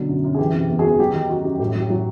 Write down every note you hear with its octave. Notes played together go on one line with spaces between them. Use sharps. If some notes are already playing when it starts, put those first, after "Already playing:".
Already playing: B2 D3 F#3
F#2
F#2
G#4
E3 G4
C3 G4
E2
F#4 G#4
E2
F#3 G4
D#3 G4
F#2 F#4
F#2 G4
A2 G4 A4
F#3
G4
F#3